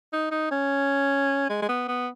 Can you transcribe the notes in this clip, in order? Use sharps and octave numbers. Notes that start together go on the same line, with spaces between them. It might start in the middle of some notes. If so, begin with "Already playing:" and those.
D#4
D#4
C#4
G#3
G#3
B3
B3